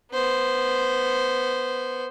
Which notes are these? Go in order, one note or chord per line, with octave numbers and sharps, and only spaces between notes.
B3 C5